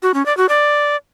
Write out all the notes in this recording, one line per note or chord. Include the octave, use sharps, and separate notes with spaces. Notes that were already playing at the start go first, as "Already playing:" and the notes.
F#4
C#4
D5
F#4
D5